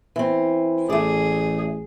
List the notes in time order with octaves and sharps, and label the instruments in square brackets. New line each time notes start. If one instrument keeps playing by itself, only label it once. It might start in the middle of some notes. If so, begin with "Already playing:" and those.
[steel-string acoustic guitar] E3 C4
[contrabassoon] A1 [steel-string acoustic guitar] A3 D5 [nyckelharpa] G#4